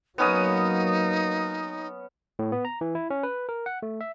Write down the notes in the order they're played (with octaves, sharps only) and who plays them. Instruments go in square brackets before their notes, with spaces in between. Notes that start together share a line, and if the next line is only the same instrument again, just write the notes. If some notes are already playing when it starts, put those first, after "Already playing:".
[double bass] F#3 A#3 [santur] B3 C#4 D#6 [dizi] D#4
[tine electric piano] A2
B3
A#5
E3
E4
C#4
B4
A#4
F#5
A3
E5